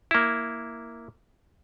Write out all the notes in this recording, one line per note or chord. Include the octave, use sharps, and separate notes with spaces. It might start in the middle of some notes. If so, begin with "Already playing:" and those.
A#3 E4